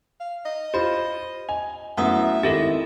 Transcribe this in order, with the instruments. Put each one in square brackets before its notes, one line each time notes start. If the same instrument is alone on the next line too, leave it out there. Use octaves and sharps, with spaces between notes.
[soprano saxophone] F5
D#5
[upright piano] F4 C5 [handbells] G4 B5
[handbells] D#5 [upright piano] G#5
[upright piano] F#2 [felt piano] A3 B3 E4 [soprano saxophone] E5 [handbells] F#5 D#6 E6
[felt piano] G#1 E4 [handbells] G4 A4 A#4 [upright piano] A6 A#6